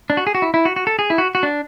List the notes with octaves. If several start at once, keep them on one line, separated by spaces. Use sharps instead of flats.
D4
F#4
G#4
F#4
E4
E4
F#4
F#4
A4
G#4
E4
F#4
F#4
D4